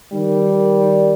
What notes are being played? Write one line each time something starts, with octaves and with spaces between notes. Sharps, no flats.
D#3 G3